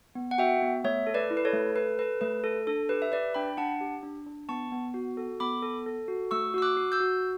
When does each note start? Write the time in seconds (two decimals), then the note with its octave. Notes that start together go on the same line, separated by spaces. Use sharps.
0.15 B3
0.31 F#5
0.38 F#4 E5 G5
0.62 B3
0.84 A3 C#5 E5
1.07 A4
1.14 B4 D5
1.31 E4
1.37 B4
1.45 A4 C#5
1.53 A3
1.75 A4 B4
1.99 A4 B4
2.21 A3 B4
2.44 A4
2.67 D4 A4
2.89 G4 B4
3.02 E5
3.12 G4 B4 D5
3.34 D4 G5 B5
3.57 D4 F#5 A5
3.81 G4
4.03 D4
4.26 D4
4.49 B3 A5 C#6
4.72 B3
4.94 F#4
5.17 A4
5.40 B3 B5 D6
5.63 A4
5.86 A4
6.08 F#4
6.31 A3 C#6 E6
6.54 F#4 E6
6.62 D6 F#6
6.77 F#4
6.92 E6 G6
7.00 F#4